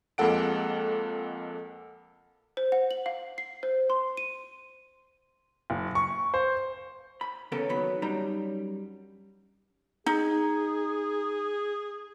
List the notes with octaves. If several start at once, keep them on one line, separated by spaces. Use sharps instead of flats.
F2 G#3 A#3 A4 F#5 D7
C5
F#5
F#7
F5
C7
C5
C6
D#7
F#1
C#6
C5
B5
C#3 E3 B3 C#4 A4 A#4
A#2 D#3 F#3 B3 B5
F#2 G3 D4 D#4 A#5 B5
D#4 G#4